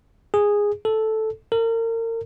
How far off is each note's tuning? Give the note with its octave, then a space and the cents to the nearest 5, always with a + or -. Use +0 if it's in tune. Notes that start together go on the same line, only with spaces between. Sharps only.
G#4 -10
A4 -5
A#4 -35